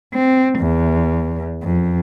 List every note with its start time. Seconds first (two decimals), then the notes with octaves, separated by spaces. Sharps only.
0.14 C4
0.59 E2
1.63 F2